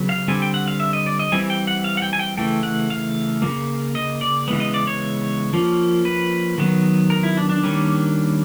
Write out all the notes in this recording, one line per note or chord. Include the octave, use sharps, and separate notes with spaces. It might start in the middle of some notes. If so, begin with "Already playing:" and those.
Already playing: C#3 F#3 B3
F5
D3 G3 C4 G#5
G5
F#5
F5
E5
D#5
D5
D#5
E3 G3 C4 G#5
G5
F#5
F5
F#5
G5
G#5
G5
C#3 E3 A3 G5
F#5
F5
C#3 F#3 A#3
D#5
D5
C#3 E3 G#3 B3
D#5
D5
C#5
F3 A#3 C#4
B4
D#3 F#3 B3
A#4
E4
D4
D4
D#3 G3 A#3 C#4